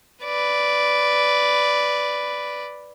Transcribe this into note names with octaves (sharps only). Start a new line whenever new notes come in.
B4 D5